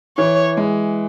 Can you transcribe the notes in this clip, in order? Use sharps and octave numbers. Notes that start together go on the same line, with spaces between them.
E3 C#5
G#3